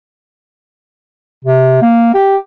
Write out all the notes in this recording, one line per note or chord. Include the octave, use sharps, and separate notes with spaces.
C3
A#3
G4